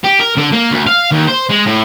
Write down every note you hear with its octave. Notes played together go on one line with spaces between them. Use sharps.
G4
A#4
D3
A#3
D2
F5
D#2
C5
G#3
A2